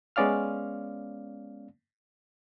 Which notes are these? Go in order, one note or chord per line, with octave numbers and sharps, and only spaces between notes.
G#3 B3 C#4 D5 F5 F6